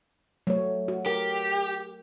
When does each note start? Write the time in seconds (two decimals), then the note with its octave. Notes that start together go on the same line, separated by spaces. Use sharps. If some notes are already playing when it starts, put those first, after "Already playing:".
0.47 F#3 A3 C#5
0.88 F#4
1.06 G4 A#4